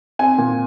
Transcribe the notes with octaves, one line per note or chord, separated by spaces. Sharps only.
C4 G#5
A#2